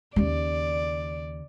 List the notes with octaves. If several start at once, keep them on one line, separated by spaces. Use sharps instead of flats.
D#2 C#3 D5